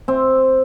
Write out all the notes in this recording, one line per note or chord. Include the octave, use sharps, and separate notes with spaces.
C4